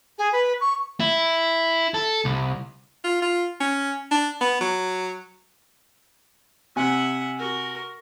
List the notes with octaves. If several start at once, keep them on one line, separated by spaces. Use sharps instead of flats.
G#4
B4
C#6
E4
A4
C2
F4
F4
C#4
D4
B3
F#3
C3 E5 F#5 G#5
F#4 A#4